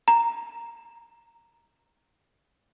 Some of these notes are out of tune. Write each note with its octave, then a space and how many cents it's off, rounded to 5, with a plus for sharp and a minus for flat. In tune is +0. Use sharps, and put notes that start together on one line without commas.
A#5 -5